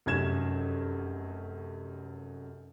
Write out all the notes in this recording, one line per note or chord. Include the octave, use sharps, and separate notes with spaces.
F1 F#2 C#4 G#6 E7